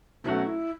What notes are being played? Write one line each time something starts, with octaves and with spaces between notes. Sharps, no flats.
B2 F#3 A3 C#4 E4 F#4
E4